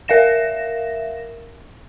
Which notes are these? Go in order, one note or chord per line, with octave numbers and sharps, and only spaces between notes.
A#4 E5 F5 A#6 E7